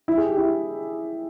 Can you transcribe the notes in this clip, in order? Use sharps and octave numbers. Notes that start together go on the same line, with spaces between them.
E4
G#4
G4
E4